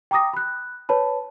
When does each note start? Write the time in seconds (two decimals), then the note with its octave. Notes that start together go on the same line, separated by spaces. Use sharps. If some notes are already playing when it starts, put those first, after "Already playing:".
0.11 G5 A#5 D6 D#6 A#6
0.33 B5 F#6
0.89 B4 C#5 A5 B5